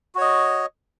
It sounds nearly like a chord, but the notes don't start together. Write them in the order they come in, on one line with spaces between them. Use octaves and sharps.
F#4 C#5 D#5